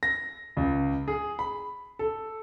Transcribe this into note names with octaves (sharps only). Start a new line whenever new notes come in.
A#6
C#2
G#4
B5
A4